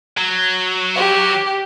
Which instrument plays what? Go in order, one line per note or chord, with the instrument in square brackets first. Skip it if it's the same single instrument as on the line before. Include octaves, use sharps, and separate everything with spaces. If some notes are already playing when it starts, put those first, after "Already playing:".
[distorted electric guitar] F#3
[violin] G4